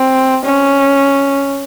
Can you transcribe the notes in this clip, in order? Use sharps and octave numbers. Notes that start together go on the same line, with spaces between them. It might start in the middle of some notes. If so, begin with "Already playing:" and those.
Already playing: C4
C#4